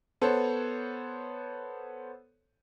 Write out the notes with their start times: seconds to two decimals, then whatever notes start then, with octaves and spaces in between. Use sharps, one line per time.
0.21 B3 A4 C5 C#5